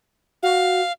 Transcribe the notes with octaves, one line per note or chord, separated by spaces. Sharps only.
F#4 F5